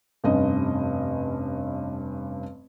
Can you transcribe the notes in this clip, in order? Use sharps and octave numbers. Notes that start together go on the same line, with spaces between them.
F1 G2 C#4 D#5